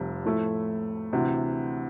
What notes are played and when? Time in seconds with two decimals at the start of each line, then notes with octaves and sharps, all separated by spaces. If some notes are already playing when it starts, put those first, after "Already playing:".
Already playing: F1 F2 C3 G3
0.25 A2 F3 A3 E4
1.13 D2 C3 E3